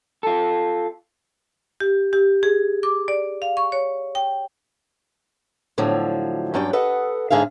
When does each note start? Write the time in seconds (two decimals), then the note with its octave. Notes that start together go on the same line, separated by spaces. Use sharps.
0.23 F4 A4
1.80 G4
2.13 G4
2.43 G#4
2.83 D6
3.08 D5
3.42 F5
3.57 C#6
3.72 C#5
4.15 G5
5.78 A2 D3 F3 F#3
6.54 G2 F#3 C#4 D5 G5
6.73 A4 B4 D#5 F#5
7.30 G#2 D3 G#4 E5 F5